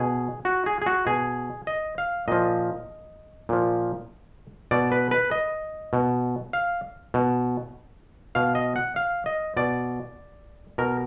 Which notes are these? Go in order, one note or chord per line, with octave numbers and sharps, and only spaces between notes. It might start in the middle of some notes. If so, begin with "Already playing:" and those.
Already playing: B2 G#4
F#4
G#4
G#4
F#4
B2 G#4
D#5
F5
A#2 F3 D#5
A#2 F3
B2 D5
B4
B4
D#5
B2
F5
B2
B2 F5
D#5
F#5
F5
D#5
B2 D5
B2 A#4